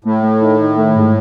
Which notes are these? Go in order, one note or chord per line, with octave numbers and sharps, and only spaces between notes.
A2 A3
A3
D#3
D#3
A3
G#2